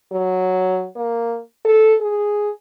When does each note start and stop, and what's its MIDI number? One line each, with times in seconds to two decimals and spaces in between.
0.12 0.86 54
0.96 1.40 58
1.65 1.95 69
2.01 2.51 68